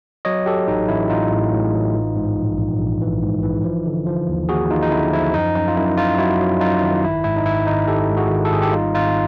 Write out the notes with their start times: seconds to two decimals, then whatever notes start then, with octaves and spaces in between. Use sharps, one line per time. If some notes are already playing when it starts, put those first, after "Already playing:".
0.25 F#3 C#5 D#5
0.46 F#3 G4 A4
0.68 A1 D#4
0.88 A1 E4
1.10 A1 D#4 F4
1.31 A2
1.53 A2
1.74 A1
1.94 E3
2.16 G#2
2.38 A#1
2.59 A#1
2.80 A#1
3.01 E3
3.22 G#2
3.43 E3
3.64 F3
3.86 D3
4.06 F3
4.29 D#2
4.49 D#2 F#4 G#4
4.70 D#2 D#4 F4
4.82 D#4
4.91 D3 E4
5.12 F3 E4
5.33 F#2 D#4
5.55 F#2 D#4
5.68 F4
5.76 F#2 E4
5.97 F#2 D#4 F4
6.18 F#3 E4 F#4
6.40 F#3
6.61 F#2 D#4 F4
6.82 D#3
7.04 G#1 E4
7.24 G#2 E4
7.36 D#4
7.46 G#1 E4
7.67 G#1 D#4
7.88 G#1 G4 A4
8.10 G#2
8.17 F#4 G#4
8.30 D#3
8.45 A4
8.51 G#1 G#4
8.62 G4 A4
8.73 G3 D#4 F4
8.95 G#1 D#4 F4